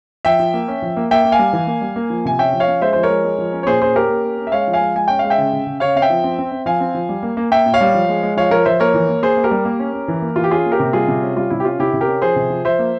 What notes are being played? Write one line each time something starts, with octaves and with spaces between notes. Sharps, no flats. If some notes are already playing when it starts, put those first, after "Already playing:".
F3 E5 G5
F3
A#3
C#4
F3
A#3
A#3 E5 G5
A#3
F5 G#5
G3
E3
A#3
G3
A#3
F3
C3 G#5
C#4 E5 G5
F3
C#5 F5
C#4
G#3 C5 E5
F3 C5
A#4 C#5
G#3
G#3
F3
C#4
C#5
A#2 G#4 C5
C#4 G#4 C5
C#4 G4 A#4
A#3
C#4
C#4
E5
G#3 C#5 F5
F3
F5 G#5
G#3
G#3 G#5
C#4 G5
G#3 F5
E5 G5
C#3
C#3
C#3
C#3 C#5 F5
C4 F5
E5 G5
F3
C4
C4
C4
F3 F5 G#5
C4
F3
G3
A#3
A#3
A#3 E5 G5
A#2
C#5 F5
G3
F3
G#3
G#3
F3 C#5 F5
F3 A#4 C#5
F3 C5 E5
A#3 A#4 C#5
E3
A#3
A#3 G#4 C5
A#3
G4 A#4
G3
A#3
C#4
C#4
E3
A#3
E3 F4
G4
C#4 F4 G#4
A#3
G4 A#4
C3
G3 F4 G#4
C3
C#4
G3 F4
C3 E4
G4
C#4 F4
C3 E4 G4
C3
G4 A#4
C#4
F3 G#4 C5
C3
F3
F3 C5 E5
A#3